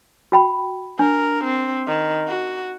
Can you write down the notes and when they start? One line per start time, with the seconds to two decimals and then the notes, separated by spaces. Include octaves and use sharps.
0.32 F#4 G5 B5
0.99 D4 A#4
1.44 C4
1.87 D#3
2.27 F#4